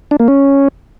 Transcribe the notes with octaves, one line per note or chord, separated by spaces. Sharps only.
D4
A#3
C#4